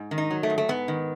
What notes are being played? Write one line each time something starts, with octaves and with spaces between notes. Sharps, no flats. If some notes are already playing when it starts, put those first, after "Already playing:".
Already playing: G#2
D#3
D#4
F#3
A3
G#2
A3
G#2 B3
D#3